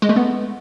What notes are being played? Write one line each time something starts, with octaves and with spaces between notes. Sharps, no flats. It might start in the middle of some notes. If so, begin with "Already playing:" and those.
G#3
A3
B3